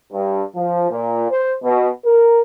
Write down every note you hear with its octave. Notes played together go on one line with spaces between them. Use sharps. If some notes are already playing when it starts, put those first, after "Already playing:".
G2
F3
A#2
C5
B2
A#4